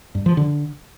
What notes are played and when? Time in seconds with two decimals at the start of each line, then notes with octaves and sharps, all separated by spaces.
0.15 G2
0.26 F3
0.37 D3